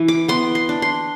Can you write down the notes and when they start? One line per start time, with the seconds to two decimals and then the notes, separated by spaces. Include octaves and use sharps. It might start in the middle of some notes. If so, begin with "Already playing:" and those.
Already playing: E3
0.08 D6
0.28 B3 C6
0.55 C6
0.69 D4
0.82 C6